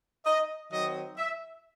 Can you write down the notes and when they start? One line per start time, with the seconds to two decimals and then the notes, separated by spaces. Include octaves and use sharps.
0.26 D#5
0.71 D#3 F#3 C4 D#5
1.17 E5